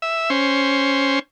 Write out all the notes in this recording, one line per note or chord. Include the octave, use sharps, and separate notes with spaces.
E5
C#4 C5